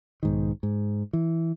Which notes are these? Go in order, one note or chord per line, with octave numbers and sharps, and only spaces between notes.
B1 G#2 D#3
G#2
E3